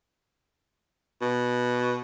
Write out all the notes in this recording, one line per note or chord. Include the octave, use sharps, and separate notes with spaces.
B2